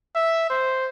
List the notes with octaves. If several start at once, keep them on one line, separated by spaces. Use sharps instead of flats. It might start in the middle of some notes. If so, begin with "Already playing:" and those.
E5
C5